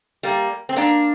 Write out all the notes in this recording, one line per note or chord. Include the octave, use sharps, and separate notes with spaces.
G3 A#3
C4
A#3 D4